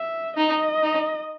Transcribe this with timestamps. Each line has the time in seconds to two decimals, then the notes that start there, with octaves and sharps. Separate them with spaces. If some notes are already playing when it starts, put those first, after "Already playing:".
Already playing: E5
0.37 D#4 D#5
0.83 D#4